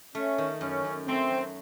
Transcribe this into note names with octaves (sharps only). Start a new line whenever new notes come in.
A3 C#4
D#3
F#2 C#4
F#2
A3 C4
F#3